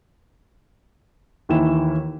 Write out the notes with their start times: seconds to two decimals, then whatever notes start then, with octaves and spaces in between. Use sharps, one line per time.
1.49 D#2 D#3 E3 E4 E7